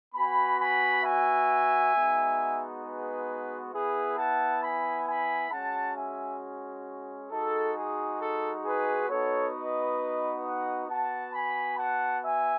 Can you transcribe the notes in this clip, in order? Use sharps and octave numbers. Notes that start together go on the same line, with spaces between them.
B3 F#4 G#5 B5
G#5 B5
E5 G#5
G#3 B3 D#4 F#4
G#4 B4
B3 E4 G#4 B4
F#5 A5
G#5 B5
G#5 B5
G#3 C#4 F#4 F#5 A5
E5 G#5
G#3 D#4 F#4 A4
G#4
A4
G#4 B4
B3 D#4 F#4 A4 C#5
B4 D#5
D#5 F#5
B3 F#4 F#5 A5
G#5 B5
F#5 A5
E5 G#5